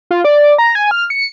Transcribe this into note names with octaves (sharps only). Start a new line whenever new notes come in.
F4
D5
A#5
G#5
F6
C#7